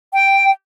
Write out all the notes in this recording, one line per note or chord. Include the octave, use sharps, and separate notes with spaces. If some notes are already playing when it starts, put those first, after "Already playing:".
G5